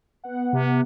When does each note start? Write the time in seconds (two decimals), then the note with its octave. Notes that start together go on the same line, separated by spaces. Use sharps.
0.24 B3 F#5
0.53 C3